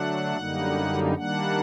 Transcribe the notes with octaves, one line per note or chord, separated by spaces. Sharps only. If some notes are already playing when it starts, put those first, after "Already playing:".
Already playing: D3 F#3 A3 D4 F#5
F#2 D3 G3 A#3 D#4
D#3 G3 A#3 D4 F#5